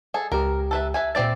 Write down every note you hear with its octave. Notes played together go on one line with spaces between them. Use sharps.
G#4 A4
C#2 G4 A#4
A4 B4 E5
B4 E5 G#5
A#2 C4 D5 E5 A6